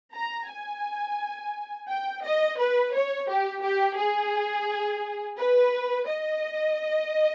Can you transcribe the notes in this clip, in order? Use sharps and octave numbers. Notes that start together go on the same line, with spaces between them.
A#5
G#5
G5
D#5
B4
C#5
G4
G4
G#4
B4
D#5